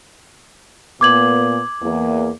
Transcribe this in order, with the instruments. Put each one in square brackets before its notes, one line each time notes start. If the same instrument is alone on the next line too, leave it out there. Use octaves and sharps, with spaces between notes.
[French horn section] A#2 B3 [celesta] D6 G#6 F#7
[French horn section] E2 A#3